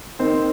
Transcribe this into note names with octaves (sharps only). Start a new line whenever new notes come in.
D#3 A#3 C4 D#4 C5